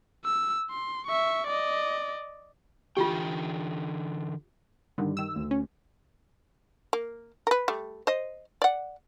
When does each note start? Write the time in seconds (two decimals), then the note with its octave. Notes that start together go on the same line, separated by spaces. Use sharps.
0.24 E6
0.70 C6
1.07 E5 C#6
1.47 D5 D#5
2.97 D3 E3 F4 G4 G5
4.98 G2 D3 D#3
5.17 D#3 E6
5.36 D2
5.51 C#4
6.93 A#3
7.47 A#4 B4
7.68 G3 A3
8.07 C5 D#5
8.62 D5 F#5